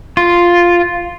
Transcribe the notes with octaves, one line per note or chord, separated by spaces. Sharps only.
F4